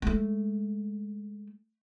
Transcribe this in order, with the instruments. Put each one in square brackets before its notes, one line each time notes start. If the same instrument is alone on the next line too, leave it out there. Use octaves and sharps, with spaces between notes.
[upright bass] G#3 A3